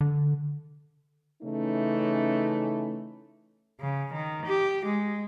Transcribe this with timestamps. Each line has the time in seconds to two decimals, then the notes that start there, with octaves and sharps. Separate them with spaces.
0.01 D3
1.42 C#3 E3 A3 C#4 D#4
3.80 C#3
4.13 D#3
4.46 G4
4.86 G#3